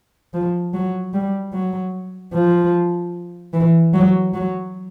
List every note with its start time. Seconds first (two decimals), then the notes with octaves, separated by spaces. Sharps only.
0.34 F3
0.73 F#3
1.14 G3
1.54 F#3
2.34 F3
3.54 E3
3.94 F#3
4.34 F#3